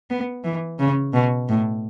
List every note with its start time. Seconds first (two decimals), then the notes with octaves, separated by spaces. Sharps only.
0.10 B3
0.44 E3
0.79 C#3
1.13 B2
1.49 A2